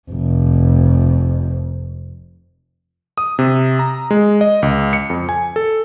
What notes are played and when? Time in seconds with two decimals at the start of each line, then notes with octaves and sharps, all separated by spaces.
0.11 F1 F2
3.18 D#6
3.39 C3
3.79 A#5
4.11 G#3
4.41 D#5
4.62 C#2
4.93 C#7
5.10 F2
5.29 G#5
5.56 A4